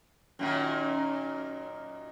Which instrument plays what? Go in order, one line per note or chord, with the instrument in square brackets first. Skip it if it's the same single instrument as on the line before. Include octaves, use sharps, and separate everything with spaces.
[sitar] F#2 A#2 D#3